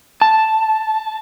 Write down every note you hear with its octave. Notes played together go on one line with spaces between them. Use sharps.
A5